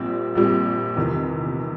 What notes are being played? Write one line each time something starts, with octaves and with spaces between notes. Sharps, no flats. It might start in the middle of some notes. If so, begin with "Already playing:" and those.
Already playing: A#1 A#2 G3 C4
A#1 A#2 G3 C4
E2 C3 D#3